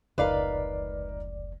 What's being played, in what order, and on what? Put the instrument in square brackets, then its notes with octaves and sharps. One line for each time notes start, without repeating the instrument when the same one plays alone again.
[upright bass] F1 G#3 [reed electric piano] C#2 D5 [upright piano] D#4 A#4 [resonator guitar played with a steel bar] B4 F5